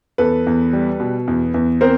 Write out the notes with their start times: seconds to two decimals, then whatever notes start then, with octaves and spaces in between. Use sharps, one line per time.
0.18 E2 A4 B4
0.47 E2
0.73 G3
1.00 B2
1.28 E2
1.54 E2
1.81 C4 A#4 C5